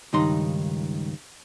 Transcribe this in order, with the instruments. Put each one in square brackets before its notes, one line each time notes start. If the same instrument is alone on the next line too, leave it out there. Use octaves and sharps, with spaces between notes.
[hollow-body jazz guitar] C#2 G2 D#3 D#4 C6